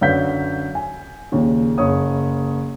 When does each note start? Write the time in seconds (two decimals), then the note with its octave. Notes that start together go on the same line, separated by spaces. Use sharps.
0.01 F#2 D3 B4 F5 G6 B6
0.75 G#5
1.32 D#2 A#2 C#3
1.78 F#1 C#5 D#6